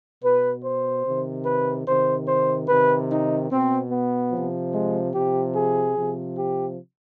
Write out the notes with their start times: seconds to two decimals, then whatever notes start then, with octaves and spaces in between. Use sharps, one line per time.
0.23 B2 B4
0.64 C5
1.05 C3 D#3
1.46 B4
1.86 C3 D#3 C5
2.27 C5
2.69 C3 D#3 B4
3.10 D#4
3.50 B2 C4
3.91 B3
4.33 C3 F3
4.74 G#3
5.14 C3 F3 G4
5.55 G#4
5.97 C3 F3
6.37 G4